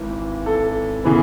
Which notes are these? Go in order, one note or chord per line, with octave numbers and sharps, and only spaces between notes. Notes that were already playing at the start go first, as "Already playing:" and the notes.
Already playing: G#1 G#2 E3
A4
C#3 E3 B3